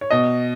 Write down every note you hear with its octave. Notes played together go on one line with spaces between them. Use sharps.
C#5
B2 D#5